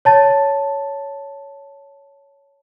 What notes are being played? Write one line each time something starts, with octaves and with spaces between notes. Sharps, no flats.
C#5 A5 A6